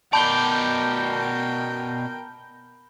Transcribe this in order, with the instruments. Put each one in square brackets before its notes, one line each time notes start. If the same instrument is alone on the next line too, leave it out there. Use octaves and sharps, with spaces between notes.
[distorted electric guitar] B2 D5 [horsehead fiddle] A#4 G5 [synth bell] A5 [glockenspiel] B5 G6 G7